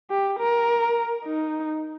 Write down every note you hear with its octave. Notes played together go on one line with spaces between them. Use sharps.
G4
A#4
D#4